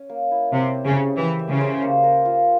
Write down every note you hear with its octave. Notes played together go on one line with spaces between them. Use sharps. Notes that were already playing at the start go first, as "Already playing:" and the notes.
Already playing: C#4
A#3
E4
C3 C#4
C5
C#3
G4
E3 G4
E5
C#3
C5
A#3
A#4
F4